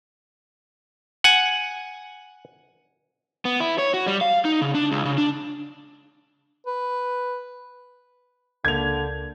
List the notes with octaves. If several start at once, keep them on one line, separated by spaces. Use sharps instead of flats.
F#5 G#5
B3
E4
C#5
F#4
G3
F5
D#4
C#3
D4
C#2
C#3
D4
B4
C#2 D3 A#3 G#6 F7